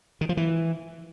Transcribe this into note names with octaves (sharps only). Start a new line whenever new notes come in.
D#3
F3
E3